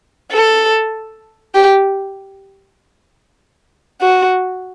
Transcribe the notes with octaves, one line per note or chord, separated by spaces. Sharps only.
A4
G4
F#4